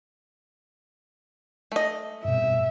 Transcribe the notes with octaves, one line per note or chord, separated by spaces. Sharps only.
A3 D#5
G2 B2 E5